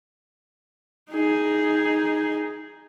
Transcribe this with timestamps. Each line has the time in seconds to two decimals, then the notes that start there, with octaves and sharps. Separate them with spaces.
1.10 D#4 G#4